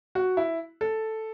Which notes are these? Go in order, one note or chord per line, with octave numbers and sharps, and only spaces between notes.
F#4
E4
A4